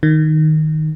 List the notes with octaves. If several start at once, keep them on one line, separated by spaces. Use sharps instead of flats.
D#3